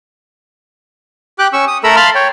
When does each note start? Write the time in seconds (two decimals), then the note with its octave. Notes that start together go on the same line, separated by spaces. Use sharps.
1.39 G4 G5 D6 F#6
1.53 C#4 C#6 E6
1.68 D#6
1.84 A3 A4 A#4 A#5 B5 E6
1.96 F5 A5 B5 C6 F6
2.15 C#5 G5